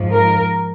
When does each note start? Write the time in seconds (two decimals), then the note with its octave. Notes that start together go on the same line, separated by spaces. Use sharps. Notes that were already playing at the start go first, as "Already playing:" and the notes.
Already playing: G#2 F3
0.11 A#4